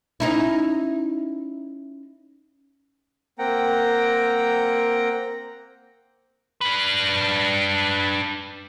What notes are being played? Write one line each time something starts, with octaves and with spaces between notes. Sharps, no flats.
C#4 D#4 E4
A#3 C4 F#5 G5 A#5
D4 B4